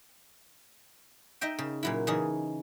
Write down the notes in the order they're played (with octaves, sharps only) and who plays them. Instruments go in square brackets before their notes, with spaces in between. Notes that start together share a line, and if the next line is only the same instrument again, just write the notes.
[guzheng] D#4 D#5 E5 G5
C#3
A#2 F#3 E4
C#3 E3 D#4 G#4